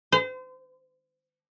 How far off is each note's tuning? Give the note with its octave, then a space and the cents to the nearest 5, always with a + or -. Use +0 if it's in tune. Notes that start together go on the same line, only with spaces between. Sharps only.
C5 -35